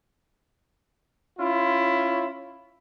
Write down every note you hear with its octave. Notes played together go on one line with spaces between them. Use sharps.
C#4 E4 F4